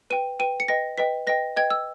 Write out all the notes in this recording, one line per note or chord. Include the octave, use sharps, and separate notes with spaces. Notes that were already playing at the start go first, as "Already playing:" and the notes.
B4 G5 D#7
B4 G5 D#7
C#7
B4 D#5 G5 A#6
B4 D#5 G5 B6
B4 D#5 G5 A#6
B4 D#5 G5 G#6
E6